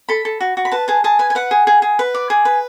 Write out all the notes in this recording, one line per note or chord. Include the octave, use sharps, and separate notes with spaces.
A4 B5
A4
F#4
F#4
B5
B4 A5
G#4 A5
G#4 A5
B4 G#5
G#5
B4 F#5
G#4
G#4
G#4
B4
D5
G#4
B4